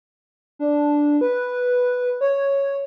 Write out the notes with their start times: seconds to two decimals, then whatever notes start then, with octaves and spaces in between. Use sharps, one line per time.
0.59 D4
1.21 B4
2.21 C#5